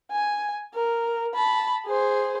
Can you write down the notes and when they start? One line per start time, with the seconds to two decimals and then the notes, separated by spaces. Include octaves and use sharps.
0.11 G#5
0.74 A#4
1.35 A5 B5
1.86 G#4 C5